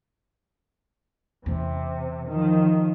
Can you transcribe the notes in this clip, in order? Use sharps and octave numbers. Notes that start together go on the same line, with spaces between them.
E2 C3 C#4
D#3 F3